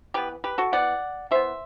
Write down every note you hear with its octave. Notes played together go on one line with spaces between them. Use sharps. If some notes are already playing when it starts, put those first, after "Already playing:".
E3 B3 G4 B4
G4 B4
F#4 A4
E3 B3 D5 F#5
E3 B3 C5 E5